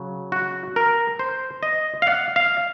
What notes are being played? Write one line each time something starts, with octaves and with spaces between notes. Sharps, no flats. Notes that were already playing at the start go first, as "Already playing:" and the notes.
Already playing: C#3 F#3
F#4
A#4
C5
D#5
F5
F#5
F5